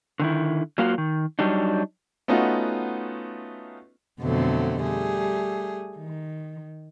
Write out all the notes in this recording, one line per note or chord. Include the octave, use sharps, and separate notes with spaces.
D3 D#3 E4
F#3 A#3 F4 F#4
D#3
F#3 G3 D4 D#4
A3 B3 C#4 D#4 F4 F#4
F2 B2 D3 F#3 A3 C4
G3 A3 G#4
D#3